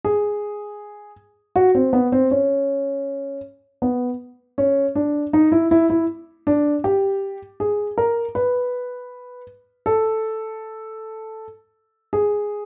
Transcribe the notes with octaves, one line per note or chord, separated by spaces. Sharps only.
G#4
F#4
C4
B3
C4
C#4
B3
C#4
D4
D#4
E4
E4
E4
D4
G4
G#4
A#4
B4
A4
G#4